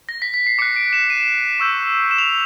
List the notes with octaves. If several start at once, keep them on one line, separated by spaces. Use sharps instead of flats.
A#6
B6
B6
C7
D6 F#6 C#7
D7
E7
D#7
C#6 E6 G6
E7
F7
E7